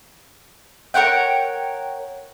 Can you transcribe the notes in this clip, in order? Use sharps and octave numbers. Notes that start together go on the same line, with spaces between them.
A#4 C#5 F#5 G5